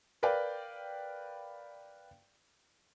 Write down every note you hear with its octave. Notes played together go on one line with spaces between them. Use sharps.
A#4 B4 D5 F5 G5